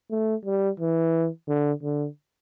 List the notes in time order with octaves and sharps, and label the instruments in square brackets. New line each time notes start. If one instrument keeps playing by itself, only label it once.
[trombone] A3
G3
E3
D3
D3